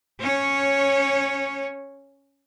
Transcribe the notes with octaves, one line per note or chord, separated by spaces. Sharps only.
C#4 C#5